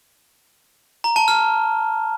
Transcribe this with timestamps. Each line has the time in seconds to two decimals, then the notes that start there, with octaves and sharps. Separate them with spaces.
1.04 A#5
1.16 A5
1.28 F6